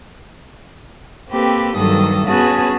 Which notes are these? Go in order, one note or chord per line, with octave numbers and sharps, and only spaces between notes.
A#3 C4 G4 A4 B4
G2 D#3 F#3 A4 D#6
B3 C#4 F#4 G#4 B4 A5